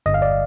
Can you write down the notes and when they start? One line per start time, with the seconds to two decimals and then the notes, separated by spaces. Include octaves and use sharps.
0.06 G1 D#5
0.14 F5
0.22 D5